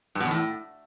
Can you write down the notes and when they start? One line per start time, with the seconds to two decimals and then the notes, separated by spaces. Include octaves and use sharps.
0.15 G2
0.21 B2
0.26 E2
0.31 A2